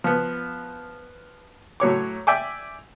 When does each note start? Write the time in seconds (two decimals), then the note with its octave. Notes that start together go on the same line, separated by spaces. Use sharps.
0.04 F3 B3
1.80 A2 F#3 C#5 D6
2.27 D5 E5 G5 G#5 D6